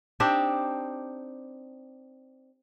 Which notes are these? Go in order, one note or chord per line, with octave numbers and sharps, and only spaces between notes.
C4 D4 D#4 G4